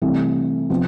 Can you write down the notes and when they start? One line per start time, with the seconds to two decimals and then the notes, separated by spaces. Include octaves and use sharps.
0.02 C2 C3 E3 A3 C4
0.70 C3 F3 B3